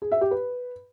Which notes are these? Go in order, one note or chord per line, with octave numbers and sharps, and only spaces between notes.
G#4
E5
G4
B4